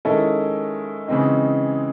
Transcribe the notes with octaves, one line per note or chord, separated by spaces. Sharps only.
D#3 G#3 C#4 E4 A4
C#3 E3 G#3 C4 D#4